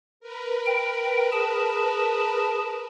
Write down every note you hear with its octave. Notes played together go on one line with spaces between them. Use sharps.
A#4 B4
G5
G#4 A5